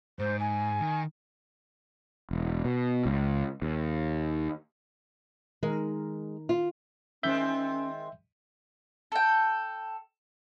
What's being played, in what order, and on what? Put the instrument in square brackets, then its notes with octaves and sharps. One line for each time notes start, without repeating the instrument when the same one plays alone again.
[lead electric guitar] G#2 [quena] C5
[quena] G#5
[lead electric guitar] D#3
[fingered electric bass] E1
B2
C#2
D#2
[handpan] D#3 A#4 [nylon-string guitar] G#3
[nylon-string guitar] F4
[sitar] D#3 G#3 C4 [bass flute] C#4 [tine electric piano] E5 G6
[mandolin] A4 G5